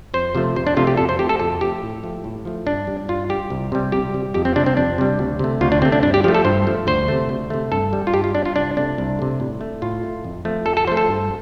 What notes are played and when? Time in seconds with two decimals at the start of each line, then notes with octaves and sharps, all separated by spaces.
0.14 F2 C5
0.35 C3 F3 A3
0.56 F2 C5
0.67 D4
0.76 C3 F3 A3 F4
0.87 G4
0.97 F2 A4
1.09 C5
1.19 F3 A3 G4
1.29 A4
1.39 F2 A4
1.61 F3 A3 G4
1.82 A2
2.04 F3 A3
2.24 A2
2.45 F3 A3
2.66 G2 D4
2.87 G3
3.09 G2 F4
3.29 G3 G4
3.50 C2
3.72 C3 G3
3.92 C2 G4
4.14 C3 G3
4.34 F2 G4
4.45 C4
4.56 C3 G3 D4
4.66 C4
4.77 F2 D4
4.98 C3 G3
5.19 D2
5.39 C3 A3
5.61 D2 F4
5.72 D4
5.82 C3 C4
5.85 A3
5.92 D4
6.03 G2 D4
6.14 G4
6.24 F3 A3 G4
6.34 A4
6.45 G2 C5
6.67 F3 A3
6.87 D2 C5
7.08 C3 A3
7.29 D2
7.50 C3 A3
7.72 G2 A4
7.93 G3
8.07 F4
8.14 G2 G4
8.24 F4
8.35 G3 D4
8.45 F4
8.56 C2 D4
8.77 C3 A3 D4
8.98 C2
9.19 C3 A3
9.40 A2
9.61 A3
9.82 A2 F4
10.03 A3
10.24 F2
10.45 F3 A3
10.66 F2 A4
10.77 A4
10.87 F3 C5
10.92 A3
10.97 A4
11.08 G2